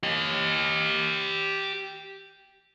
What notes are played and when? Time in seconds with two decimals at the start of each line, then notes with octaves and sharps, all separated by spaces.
0.03 G4 D#5